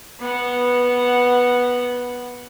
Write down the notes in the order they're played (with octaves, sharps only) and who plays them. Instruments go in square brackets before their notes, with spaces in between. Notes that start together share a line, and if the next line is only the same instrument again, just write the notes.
[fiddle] B3 F#5